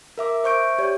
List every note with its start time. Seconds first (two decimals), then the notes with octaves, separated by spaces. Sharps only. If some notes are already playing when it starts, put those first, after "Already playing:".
0.18 A#4 E5 D6
0.44 C5 E5 C#6 G6 D7
0.79 G4 C#5 D5